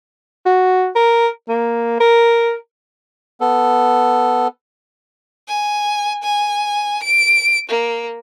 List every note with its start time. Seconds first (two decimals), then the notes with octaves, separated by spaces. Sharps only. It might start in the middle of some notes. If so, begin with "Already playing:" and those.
0.46 F#4
0.96 A#4
1.49 A#3
2.00 A#4
3.41 B3 A4
5.48 G#5
6.23 G#5
7.03 D7
7.69 A#3